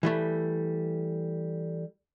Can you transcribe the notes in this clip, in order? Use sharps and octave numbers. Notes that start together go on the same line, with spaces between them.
E3 G3 A3